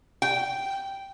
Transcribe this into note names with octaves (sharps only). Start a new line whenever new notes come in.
G5